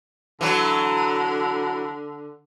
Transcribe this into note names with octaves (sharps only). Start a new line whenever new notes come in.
D3 E3 F#3